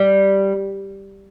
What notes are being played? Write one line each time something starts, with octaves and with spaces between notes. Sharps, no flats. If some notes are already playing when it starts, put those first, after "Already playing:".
Already playing: G3